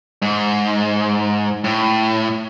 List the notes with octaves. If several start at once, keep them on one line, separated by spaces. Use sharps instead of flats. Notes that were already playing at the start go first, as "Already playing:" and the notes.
G#2
A2